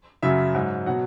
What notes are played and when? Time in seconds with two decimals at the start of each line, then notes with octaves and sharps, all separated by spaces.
0.23 F#2 C#3 F#3 E5
0.55 G#2 F#3
0.86 B2 F#3 F#5